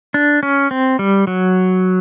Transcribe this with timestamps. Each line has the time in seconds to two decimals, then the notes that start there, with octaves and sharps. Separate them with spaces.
0.14 D4
0.43 C#4
0.71 C4
0.99 G3
1.27 F#3